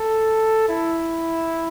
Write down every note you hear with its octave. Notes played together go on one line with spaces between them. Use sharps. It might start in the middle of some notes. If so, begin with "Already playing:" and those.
Already playing: A4
E4